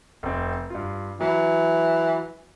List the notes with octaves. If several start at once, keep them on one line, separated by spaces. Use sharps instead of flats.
F1 C4
G2 F4
E3 F#3